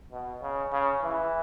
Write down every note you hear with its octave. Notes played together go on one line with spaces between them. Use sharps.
B2
C#3
C#3
E3